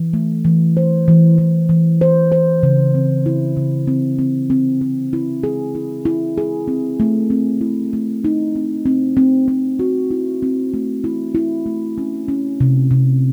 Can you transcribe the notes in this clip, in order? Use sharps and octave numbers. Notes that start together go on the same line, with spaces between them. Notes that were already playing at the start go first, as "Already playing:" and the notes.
Already playing: E3
A3
E3
C5
E3
E3
E3
C5
C5
C#3
C4
E4
C#3
C4
C4
C4
C4
E4
G#4
E4
E4
G#4
C4
A3
C4
E4
A3
D#4
C4
C4
C4
C4
F#4
E4
C4
A3
E4
E4
A3
C#4
C#4
C3
C3